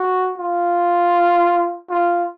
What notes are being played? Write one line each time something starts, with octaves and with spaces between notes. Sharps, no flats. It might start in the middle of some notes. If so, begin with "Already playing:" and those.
Already playing: F#4
F4
F4